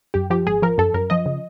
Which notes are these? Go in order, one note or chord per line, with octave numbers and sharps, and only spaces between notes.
F#2 G4
F3 G4
G#1 G#4
F3 A#4
F#2 A4
F#2 A#4
F3 D#5
C#3